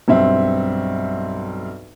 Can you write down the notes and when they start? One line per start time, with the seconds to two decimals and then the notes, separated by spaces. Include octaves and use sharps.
0.08 B1 G2 C4 E5